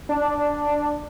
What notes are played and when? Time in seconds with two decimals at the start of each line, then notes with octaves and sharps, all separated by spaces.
0.09 D4